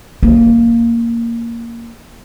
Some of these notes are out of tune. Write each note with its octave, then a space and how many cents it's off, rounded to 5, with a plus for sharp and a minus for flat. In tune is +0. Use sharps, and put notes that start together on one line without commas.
A#3 -5 C#4 +30